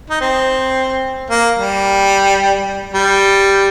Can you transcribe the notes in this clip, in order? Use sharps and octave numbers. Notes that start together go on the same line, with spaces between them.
D#4
C4
A#3
G3
G3